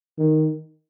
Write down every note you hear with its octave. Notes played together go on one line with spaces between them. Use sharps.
D#3